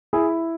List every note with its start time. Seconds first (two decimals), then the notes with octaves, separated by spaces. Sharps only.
0.13 E4 G#4